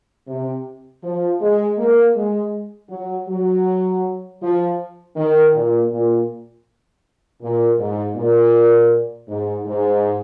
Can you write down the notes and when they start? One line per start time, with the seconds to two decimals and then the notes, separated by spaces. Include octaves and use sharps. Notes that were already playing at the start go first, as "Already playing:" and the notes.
0.27 C3
1.03 F3
1.40 G#3
1.77 A#3
2.15 G#3
2.90 F#3
3.28 F#3
4.41 F3
5.16 D#3
5.53 A#2
5.91 A#2
7.42 A#2
7.79 G#2
8.16 A#2
9.28 G#2
9.66 G#2